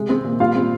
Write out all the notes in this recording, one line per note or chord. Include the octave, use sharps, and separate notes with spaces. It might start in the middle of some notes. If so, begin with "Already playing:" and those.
Already playing: C3 G#3
C4
A#2
G3 F4 F5
C4